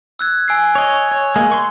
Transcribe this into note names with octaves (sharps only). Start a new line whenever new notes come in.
E6 F#6 G#6
G#5 E6 C7
C#5 D#5
C#5
G#3 A#3 G#4
C6 C#6